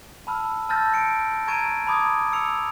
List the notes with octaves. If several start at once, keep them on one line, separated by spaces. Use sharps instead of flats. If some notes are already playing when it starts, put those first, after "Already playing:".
A5 B5 E6 F6
A5 E6 F6 G6 A6 A#6
A5 C#7 D7
A#5 C#6 G#6 A6 D7 D#7
A5 B5 D6 D#6 G#6
E6 C#7 F7